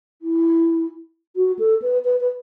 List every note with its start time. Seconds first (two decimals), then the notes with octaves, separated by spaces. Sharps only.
0.22 E4
1.36 F#4
1.59 A4
1.82 B4
2.04 B4
2.20 B4